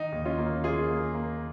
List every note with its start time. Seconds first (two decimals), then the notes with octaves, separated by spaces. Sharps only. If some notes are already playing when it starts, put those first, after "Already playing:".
Already playing: D#3 D#4
0.12 D#2
0.25 C#4 F4
0.38 A#3
0.64 A#3 F4 G#4
0.89 A#3
1.15 A#3